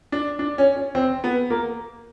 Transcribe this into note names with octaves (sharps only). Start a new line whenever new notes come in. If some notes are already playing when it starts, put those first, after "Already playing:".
D4
D4
C#4
C#4
C4
B3
A#3